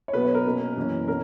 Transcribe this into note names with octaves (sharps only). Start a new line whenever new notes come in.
C#5
B2 F#3 B3 B4
C#5
A#4
B2 A#3 C#4
F#2 E3 A#3 C#4
B2 C#4 A#4